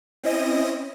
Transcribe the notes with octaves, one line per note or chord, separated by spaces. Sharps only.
C4 C#4 E4 D#5 D#6 A#6